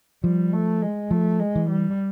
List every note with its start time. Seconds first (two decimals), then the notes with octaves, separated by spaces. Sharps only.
0.24 F3 G3
0.53 A3
0.82 G#3
1.11 F3 A3
1.40 G#3
1.55 E3
1.70 G3